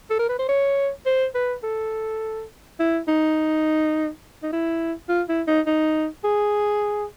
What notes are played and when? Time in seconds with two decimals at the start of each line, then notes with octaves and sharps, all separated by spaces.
0.10 A4
0.19 A#4
0.29 B4
0.39 C5
0.49 C#5
1.06 C5
1.35 B4
1.63 A4
2.80 E4
3.08 D#4
4.43 D#4
4.52 E4
5.09 F4
5.29 E4
5.47 D#4
5.66 D#4
6.24 G#4